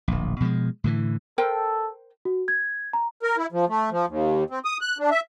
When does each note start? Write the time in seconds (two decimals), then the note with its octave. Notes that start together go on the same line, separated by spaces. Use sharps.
0.08 D1 A#1
0.40 B2 F3 F#3 G#3
0.84 A2 D3 E3
1.38 A4 A#4 C5 G5
2.25 F#4
2.48 G#6
2.93 A#5
3.23 A#4
3.37 E4
3.52 F3
3.68 A3
3.91 F3
4.08 D#2
4.50 C4
4.65 D#6
4.81 F#6
4.99 D4
5.11 E5